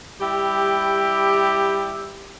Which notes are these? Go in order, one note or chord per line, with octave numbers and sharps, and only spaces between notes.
G3 E4 G4